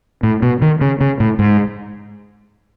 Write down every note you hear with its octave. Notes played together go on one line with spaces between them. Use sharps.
A2
B2
D#3
C#3
C#3
A2
G#2